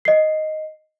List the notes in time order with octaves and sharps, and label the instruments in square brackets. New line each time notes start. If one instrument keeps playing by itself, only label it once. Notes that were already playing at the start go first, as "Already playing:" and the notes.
[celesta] D#5 C7